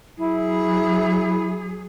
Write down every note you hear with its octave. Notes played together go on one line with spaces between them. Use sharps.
F#3 E4 G#4